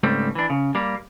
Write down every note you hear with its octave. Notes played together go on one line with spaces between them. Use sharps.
C#2 G#2 G3 A3 C4
E3 D4
C#3
G3 A#3